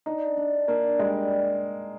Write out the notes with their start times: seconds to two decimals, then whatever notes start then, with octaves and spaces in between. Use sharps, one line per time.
0.06 D4 D#4
0.37 D4
0.68 A#3 D4
0.99 G3 G#3